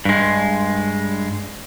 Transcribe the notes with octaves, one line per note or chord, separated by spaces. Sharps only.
G2 G#3